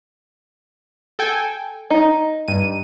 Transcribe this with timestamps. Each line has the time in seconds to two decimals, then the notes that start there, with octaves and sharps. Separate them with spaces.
1.19 A4 G5 G#5
1.90 D#4
2.48 G2 D#7